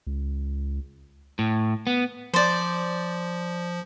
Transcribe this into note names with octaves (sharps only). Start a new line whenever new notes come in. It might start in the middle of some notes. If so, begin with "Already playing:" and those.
C#2
A2
B3
F3 C5 D5